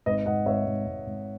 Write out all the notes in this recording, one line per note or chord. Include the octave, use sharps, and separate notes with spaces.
G#1 B4 D#5
G#1 D#5 F#5
G#1 C#5 E5
G#1
G#1
G#1